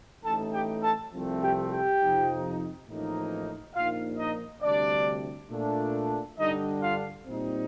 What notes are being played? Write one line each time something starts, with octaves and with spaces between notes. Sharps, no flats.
A1 A2 A3 D#4 A4 A5
G4 G5
A4 A5
C2 C3 F3 A3 C4
G4 G5
G4 G5
F2 C3 F3 C4 D#4
A1 A2 F3 A#3 D#4
A#1 A#2 F3 A#3 D#4 F4 F5
D#4 D#5
D2 C3 G3 D4 D5
A#2 A3 D4
G2 D3 G3 D4 D#4 D#5
F4 F5
A#2 G3 C4 D#4